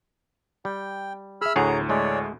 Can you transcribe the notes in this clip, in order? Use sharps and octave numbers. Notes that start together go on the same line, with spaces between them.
G3 G5
G#4 E5 B5 E6 F6
D2 A2 G#4 C#5 F#5 A#5
G#3 A3 C#5 D5